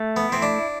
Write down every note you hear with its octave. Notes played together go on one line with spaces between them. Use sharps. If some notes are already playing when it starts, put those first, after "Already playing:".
Already playing: A3
B3
C4 E4
D4